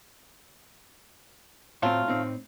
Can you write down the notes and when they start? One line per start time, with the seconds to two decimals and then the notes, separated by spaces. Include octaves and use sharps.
1.82 A2 F#3 A3 C4 F4
2.08 A2 C4 D#4